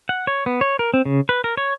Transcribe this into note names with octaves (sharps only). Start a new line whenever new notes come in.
F#5
C#5
B3
C#5
A#4
C4
C#3
B4
A#4
C#5